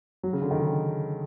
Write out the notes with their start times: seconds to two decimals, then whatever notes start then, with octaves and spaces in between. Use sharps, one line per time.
0.23 F#3
0.33 C#3
0.42 D3
0.51 D#3
0.60 C#3